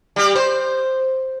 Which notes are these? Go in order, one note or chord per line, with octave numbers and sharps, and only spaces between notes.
G3 G4
C5